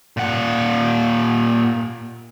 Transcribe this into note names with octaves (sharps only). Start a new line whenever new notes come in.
A#2 F#5